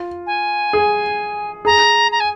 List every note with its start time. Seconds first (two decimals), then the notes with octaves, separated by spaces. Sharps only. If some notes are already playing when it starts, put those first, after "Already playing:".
Already playing: F4
0.26 G#5
0.73 G#4
1.65 G#4 A#5
2.11 A#5
2.20 G#5